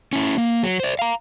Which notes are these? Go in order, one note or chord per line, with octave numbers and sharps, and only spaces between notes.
C#4 E4
A#3
F#3
C5 D5
F5 A#5